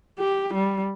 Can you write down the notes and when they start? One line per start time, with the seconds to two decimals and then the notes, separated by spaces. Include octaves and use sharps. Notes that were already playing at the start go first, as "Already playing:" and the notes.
0.19 G4
0.54 G3